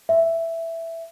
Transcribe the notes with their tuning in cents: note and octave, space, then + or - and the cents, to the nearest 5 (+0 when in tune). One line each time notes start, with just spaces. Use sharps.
E5 +5